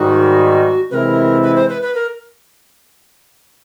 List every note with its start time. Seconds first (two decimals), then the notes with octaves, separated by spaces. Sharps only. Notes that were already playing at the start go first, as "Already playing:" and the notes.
Already playing: G#2 D#3 G3 F#4
0.91 C3 E3 G#3 C4 E4 A#4 B4
1.43 B4
1.56 C5
1.69 B4
1.82 B4
1.95 A#4